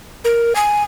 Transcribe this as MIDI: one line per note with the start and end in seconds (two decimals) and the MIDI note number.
0.24 0.53 70
0.55 0.83 80